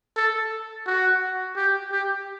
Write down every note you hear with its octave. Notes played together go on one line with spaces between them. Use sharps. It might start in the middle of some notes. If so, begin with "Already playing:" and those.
A4
F#4
G4
G4